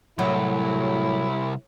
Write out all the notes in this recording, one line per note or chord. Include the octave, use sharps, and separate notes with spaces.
C2 A2 F#3 E4